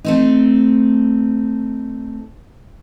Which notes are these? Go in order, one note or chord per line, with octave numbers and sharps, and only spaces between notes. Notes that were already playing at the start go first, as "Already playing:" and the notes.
A3 C4 D#4